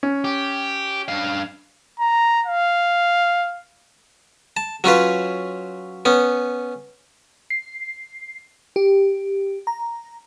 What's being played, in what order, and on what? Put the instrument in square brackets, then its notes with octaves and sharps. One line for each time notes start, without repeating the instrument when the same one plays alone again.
[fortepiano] C#4
[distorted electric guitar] G4
G2 F5
[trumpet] A#5
F5
[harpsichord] A5
F#3 C#4 F4 B4
B3 C#4
[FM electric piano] C7
G4
A#5